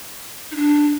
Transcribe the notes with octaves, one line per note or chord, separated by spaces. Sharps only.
D#4
D4